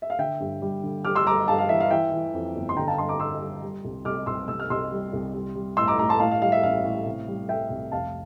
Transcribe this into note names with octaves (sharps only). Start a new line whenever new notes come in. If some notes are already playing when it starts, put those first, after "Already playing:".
E5
F5
D3 E5 G5
G2
G3
D3
G3 D6 F6
C6 E6
G3 A#5 D6
G2 F5 A5
F5
E3 E5
F5
E3 E5 G5
E3
F2
G1
C6
D3 G5 A#5
F5 A5
G2 A5 C6
A#5 D6
G3 C6 E6
G3
G3
C2
C2 D6 F6
C2 C6 E6
C2 E6
F6
C2 C6 E6
G3
C2
G3
G3
A2 C6 E6
A#5 D6
A2 A#5 D6
A5 C6
A2 F5 A5
F5
G3 F5
E5
A1 F5
A2
C3
G3
G3 E5 G5
C2
F1 F5 A5